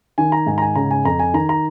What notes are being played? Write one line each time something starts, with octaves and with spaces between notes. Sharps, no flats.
D#3 G#5
A#5
G#2 G#5
A#5
G#5
C#3 A#5
G#5
F2 A#5
G#5
D#3 A#5
A#5